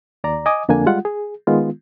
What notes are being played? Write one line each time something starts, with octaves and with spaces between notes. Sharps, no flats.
D#2 D5 A#5
D#5 G#5 D6 D#6
F2 D3 A#3 D4 G#5
G3 G#3 F4 F#5
G#4
D#3 G#3 B3 F4